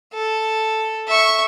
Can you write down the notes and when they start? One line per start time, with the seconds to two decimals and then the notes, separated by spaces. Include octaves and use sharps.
0.13 A4
1.08 E5 C#6